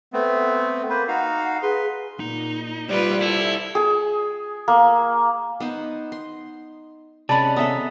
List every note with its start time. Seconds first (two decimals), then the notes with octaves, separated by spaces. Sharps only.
0.13 A3 B3 C4
0.90 A#3 B4 C5 B5
1.08 D#4 F#4 F5 F#5
1.62 G#4 B4 C6
2.20 A#2 D#4
2.89 G3 F4 B4 C5 D5
3.22 E4 A4
3.75 G#4
4.68 A#3
5.60 B3 D#4 C5
6.12 C6
7.29 C3 G#3 C#4 B4 D5 A5 B5 A6
7.56 B3 A4 E5 A#5 D#6